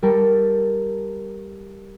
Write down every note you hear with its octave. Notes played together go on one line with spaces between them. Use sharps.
G3 A4 A#4